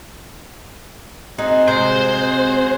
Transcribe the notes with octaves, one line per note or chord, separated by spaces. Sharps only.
C4 D#4 F#4 G#4
C3 G#3 C5